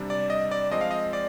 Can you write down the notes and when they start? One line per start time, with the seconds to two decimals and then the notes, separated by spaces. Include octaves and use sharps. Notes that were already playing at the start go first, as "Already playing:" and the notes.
Already playing: C3 G3 D4
0.10 D5
0.30 D#5
0.51 D5
0.71 F3 G#3 C4 D#5
0.81 F5
0.91 D#5
1.13 D5